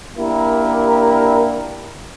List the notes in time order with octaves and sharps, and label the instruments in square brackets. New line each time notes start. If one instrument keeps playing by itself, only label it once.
[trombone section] A#3 D4 E4 G4 A#4